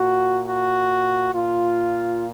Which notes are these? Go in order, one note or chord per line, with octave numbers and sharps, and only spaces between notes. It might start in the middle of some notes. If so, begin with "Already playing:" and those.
Already playing: A#2 F#4
F#4
A#2 F4